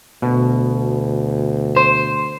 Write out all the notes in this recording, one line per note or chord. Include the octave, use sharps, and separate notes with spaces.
D2 B2
C5